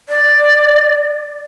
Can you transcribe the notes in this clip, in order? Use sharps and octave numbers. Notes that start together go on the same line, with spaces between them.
D5